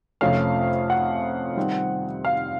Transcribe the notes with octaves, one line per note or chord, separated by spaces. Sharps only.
F2 C3 F3 A3 C#4 F5
F#5
D#3 G3 C4
F5